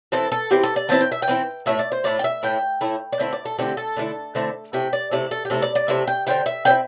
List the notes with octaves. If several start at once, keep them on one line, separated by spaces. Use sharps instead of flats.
E3 C4 E4 A4
A4
E3 C4 E4 G4
A4
D5
E3 C4 E4 A5
G5
E5
G5
E3 C4 E4
A2 A3 E4 E5
D5
C5
A2 A3 E4 D5
G5
E5
A2 A3 E4 G5
A2 A3 E4
D5
D3 A3 C4 E4 E5
D5
A4
D3 A3 C4 E4 G4
A4
D3 A3 C4 E4
D3 A3 C4 E4
C3 A3 E4 G5
D5
C3 A3 E4 D5
A4
G4
C3 A3 E4 A4
D5
D5
C3 A3 E4 E5
G5
D3 C4 E4 G5
E5
D3 C4 E4 G5